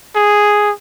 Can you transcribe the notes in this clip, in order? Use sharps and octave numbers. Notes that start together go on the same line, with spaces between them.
G#4